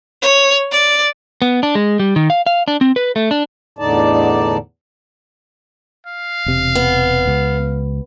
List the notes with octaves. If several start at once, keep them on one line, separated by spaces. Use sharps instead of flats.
C#5
D5
B3
D4
G#3
G3
D#3
F5
F5
D4
C4
B4
A3
D4
E2 A2 D3 D#4 D5 A5
F5
E1 C3
B3
C#2